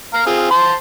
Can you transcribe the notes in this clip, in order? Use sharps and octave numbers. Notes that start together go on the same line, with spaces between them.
F5 A#5
C4 F4 G#4
C5 A5 C6